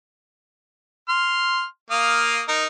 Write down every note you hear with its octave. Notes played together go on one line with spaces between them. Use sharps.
C6 F6
A#3 F5 D#6
D#4 A#4